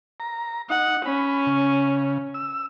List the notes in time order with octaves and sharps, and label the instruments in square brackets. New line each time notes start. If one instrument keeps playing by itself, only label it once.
[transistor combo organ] A#5
[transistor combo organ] D#4 [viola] F#5
[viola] C#4 [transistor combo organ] B5
[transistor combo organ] C#3
E6